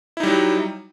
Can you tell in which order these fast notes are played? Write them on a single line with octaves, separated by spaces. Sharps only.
E4 D#4 G3 F#3